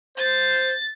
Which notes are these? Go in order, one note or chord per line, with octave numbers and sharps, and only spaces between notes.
C5 A6